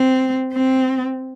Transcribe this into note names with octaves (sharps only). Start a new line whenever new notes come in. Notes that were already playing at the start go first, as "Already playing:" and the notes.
Already playing: C4
C4